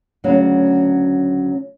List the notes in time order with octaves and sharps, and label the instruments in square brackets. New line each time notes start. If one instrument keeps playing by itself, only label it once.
[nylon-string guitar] D2 C#3 F#3 C#4 F5